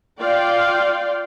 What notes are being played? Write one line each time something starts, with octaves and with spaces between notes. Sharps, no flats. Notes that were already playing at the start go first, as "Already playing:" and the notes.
F4 D5 F5 G5